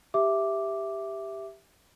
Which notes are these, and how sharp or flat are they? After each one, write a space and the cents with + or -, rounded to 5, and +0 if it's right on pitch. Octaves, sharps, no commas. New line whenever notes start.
G4 +5 E5 +0 D6 +0